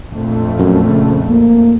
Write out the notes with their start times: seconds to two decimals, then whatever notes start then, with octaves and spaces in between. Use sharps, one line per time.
0.11 A#1 F2 A3
0.59 F#2
0.89 C#3
1.30 A#3